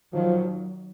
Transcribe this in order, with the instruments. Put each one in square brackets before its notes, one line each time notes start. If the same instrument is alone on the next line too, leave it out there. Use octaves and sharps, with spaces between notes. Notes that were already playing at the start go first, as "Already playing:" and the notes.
[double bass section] D#3 F#3 [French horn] F3